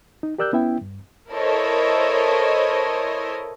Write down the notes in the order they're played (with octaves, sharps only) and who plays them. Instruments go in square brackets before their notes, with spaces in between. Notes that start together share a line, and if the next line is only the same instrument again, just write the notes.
[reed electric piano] D#4
G4 A#4 D5 E6 F#6 G6
B3 C#4 E4 E5 G5
G2
[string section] E4 A4 A#4 C5 C#5 D#5